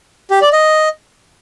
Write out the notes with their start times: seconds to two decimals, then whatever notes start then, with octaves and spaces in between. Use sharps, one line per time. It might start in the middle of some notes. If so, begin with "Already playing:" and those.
0.31 G4
0.42 D5
0.53 D#5